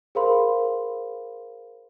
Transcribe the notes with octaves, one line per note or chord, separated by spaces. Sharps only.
G#4 A#4 C5 F5 B5 C6